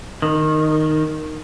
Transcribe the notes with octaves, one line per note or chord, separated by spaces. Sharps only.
D#3